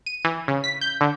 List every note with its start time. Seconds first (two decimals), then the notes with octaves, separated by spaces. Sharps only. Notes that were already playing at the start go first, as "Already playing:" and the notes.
0.06 D#7
0.25 E3
0.48 C#3
0.64 B6
0.81 G6
1.01 D3